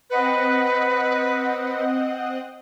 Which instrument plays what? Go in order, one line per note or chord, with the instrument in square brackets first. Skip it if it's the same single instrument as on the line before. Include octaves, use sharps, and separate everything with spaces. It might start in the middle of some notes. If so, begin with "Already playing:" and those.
[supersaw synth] C4 D#5 F#5 [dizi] B4